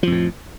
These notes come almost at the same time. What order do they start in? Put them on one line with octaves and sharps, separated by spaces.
F3 F2 A2